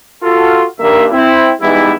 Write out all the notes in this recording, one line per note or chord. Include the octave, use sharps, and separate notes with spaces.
F4 F#4 A4
G2 D#3 A#3 E5
C4 E4
E3 G3 G#3 B3 D#4 E4